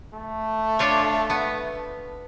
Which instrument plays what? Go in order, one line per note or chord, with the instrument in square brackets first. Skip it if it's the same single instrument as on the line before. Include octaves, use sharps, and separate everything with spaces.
[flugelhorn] A3
[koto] D4 F4 C#5
B3